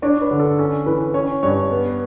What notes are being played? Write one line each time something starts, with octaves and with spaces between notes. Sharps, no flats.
D4 C#5
B4
D3
A4
C#4 A4
E3 B4
C#4 C#5
G2 C#5
B3